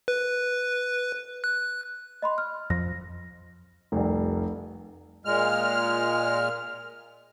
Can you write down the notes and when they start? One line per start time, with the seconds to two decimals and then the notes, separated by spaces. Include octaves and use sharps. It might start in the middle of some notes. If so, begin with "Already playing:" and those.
0.08 B4
1.44 F#6
2.22 D#5 B5 C6
2.38 F6
2.70 F2 A#6
3.92 F1 C2
5.25 A#2 G#3 F6